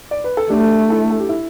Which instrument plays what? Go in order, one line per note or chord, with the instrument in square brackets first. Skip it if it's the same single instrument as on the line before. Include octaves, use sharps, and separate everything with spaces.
[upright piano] D5
B4
A4
[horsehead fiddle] A3 [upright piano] D4 G4
[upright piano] E4 A4
A4
G4
E4